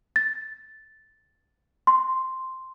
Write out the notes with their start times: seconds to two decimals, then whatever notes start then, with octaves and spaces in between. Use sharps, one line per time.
0.16 A6
1.87 C6